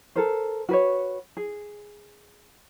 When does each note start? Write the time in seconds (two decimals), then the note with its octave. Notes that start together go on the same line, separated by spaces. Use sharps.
0.16 A4 A#4 C5
0.69 F#4 B4 C#5
1.37 G#4